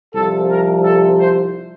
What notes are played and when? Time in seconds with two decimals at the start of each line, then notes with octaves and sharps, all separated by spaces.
0.14 C2 C3 F3 A4
0.49 A#4
0.84 A4
1.18 C5